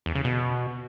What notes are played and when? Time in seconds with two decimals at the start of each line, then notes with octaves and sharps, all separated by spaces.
0.06 E2
0.15 C#3
0.24 B2